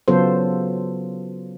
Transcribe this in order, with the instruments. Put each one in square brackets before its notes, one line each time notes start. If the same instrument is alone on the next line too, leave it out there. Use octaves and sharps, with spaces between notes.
[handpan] C#3 F#3 B3 F4 A4 C5